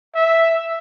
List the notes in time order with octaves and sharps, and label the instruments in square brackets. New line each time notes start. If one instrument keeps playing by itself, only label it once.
[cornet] E5